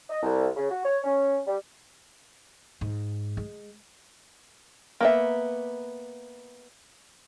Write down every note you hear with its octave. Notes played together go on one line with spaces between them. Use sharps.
D#5
C2
C#3
F#4
C#5
C#4
G3
G#2
G#3
A#3 B3 E5